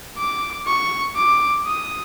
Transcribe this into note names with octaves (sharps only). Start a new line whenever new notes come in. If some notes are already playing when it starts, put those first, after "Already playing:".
D6
C#6
D6
D#6